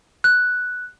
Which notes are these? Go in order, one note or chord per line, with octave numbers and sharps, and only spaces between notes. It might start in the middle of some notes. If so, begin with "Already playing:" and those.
F#6